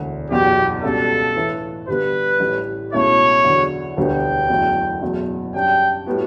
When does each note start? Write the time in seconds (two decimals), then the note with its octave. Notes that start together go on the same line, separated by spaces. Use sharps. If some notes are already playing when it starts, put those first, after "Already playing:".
Already playing: E1 D2 D3
0.30 F#1 E2 B2 G4
0.83 C#2 B2 G3 D4 A4
1.36 A2 E3 A3
1.88 G2 D3 G3 B3 B4
2.40 A1 A2 G3
2.92 C#2 B2 A3 E4 C#5
3.44 E2 D3 F#3
3.97 E1 D2 D3 G3 B3 G5
4.49 F#1 E2 D3 F#3 A3
5.02 F#1 E2 B2 F#3 A3
5.54 F#2 C#3 G3 D4 G5
6.06 A2 G3 B3 F#4